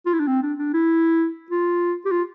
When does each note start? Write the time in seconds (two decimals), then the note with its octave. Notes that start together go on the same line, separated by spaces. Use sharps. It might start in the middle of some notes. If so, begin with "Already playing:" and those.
0.06 F4
0.13 E4
0.19 D4
0.27 C4
0.42 D4
0.58 D4
0.73 E4
1.50 F4
2.05 G4
2.11 F4